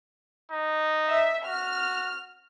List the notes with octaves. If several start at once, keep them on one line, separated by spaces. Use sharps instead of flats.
D#4
E5
F#4 F6